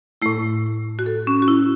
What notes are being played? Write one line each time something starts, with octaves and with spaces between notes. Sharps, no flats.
A2 A3 E4
F#4
A4
C#4
F#4
E4